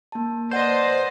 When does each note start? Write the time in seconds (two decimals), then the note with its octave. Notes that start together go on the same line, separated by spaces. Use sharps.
0.12 A#3 A5
0.51 B4 C5 D5 D#5 F#5